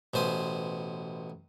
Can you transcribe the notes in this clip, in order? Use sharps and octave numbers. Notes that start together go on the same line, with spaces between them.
A1 B2 C5 G#5